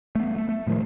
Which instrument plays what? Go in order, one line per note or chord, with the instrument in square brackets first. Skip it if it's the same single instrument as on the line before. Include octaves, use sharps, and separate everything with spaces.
[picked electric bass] A3 B3
A3
A3
A2 D#3 F3 G#3